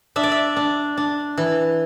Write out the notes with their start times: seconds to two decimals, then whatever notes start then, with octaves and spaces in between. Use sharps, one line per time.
0.16 D4 E5
0.23 D5
0.32 E5
0.57 D4
0.97 D4
1.38 E3